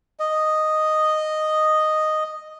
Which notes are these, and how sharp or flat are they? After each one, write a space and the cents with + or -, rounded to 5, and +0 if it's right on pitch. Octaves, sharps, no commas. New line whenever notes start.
D#5 -5